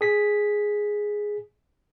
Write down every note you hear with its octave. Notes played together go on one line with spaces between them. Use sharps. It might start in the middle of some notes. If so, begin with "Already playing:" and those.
G#4 B6